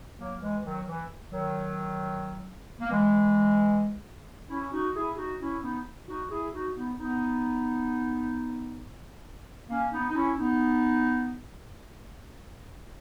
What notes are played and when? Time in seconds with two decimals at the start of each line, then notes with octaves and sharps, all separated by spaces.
0.19 F#3 A#3
0.41 E3 G#3
0.64 D#3 F#3
0.87 E3
1.32 D#3 F#3
2.80 A#3
2.91 E3 G#3
4.49 C#4 E4
4.72 D#4 F#4
4.94 E4 G#4
5.17 D#4 F#4
5.40 C#4 E4
5.63 B3 D#4
6.08 D#4 F#4
6.30 E4 G#4
6.53 D#4 F#4
6.75 B3 D#4
6.98 B3 D#4
9.70 A#3 C#4
9.92 B3 D#4
10.09 D#4
10.15 C#4 E4
10.38 B3 D#4